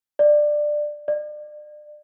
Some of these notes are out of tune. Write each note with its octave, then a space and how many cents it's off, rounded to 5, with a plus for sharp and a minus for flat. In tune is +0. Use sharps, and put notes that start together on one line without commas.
D5 +15
D5 +35